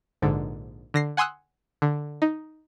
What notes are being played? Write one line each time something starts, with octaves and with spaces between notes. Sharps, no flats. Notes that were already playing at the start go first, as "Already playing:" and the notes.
A#1 G#2 D3
D3 A#6 C7
F#5 G#5 C6 D#6 E6 F#6
D3
D#4